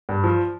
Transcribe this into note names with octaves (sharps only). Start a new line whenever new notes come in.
G2
F3